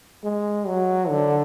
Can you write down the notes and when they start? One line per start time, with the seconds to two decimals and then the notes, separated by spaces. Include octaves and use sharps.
0.24 G#3
0.67 F#3
1.09 D3